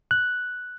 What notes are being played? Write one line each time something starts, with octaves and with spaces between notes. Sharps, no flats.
F#6